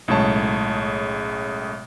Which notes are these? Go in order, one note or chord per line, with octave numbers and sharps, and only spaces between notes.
B1 A2 C#3 G#3 C#5 A5